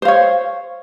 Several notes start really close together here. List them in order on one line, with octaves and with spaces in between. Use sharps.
C5 F5 C#5